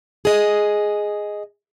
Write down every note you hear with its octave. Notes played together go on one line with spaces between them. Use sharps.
G#4 D#5